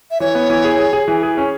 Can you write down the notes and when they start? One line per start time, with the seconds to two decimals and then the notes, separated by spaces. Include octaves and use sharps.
0.11 E5
0.20 E3 C#5
0.35 B3
0.49 E3
0.64 G#4
0.79 G#4
0.93 G#4
1.08 E3
1.23 G#4
1.37 C#4